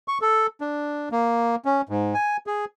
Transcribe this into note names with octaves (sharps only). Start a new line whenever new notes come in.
C#6
A4
D4
A#3
C#4
G#2
G#5
G#4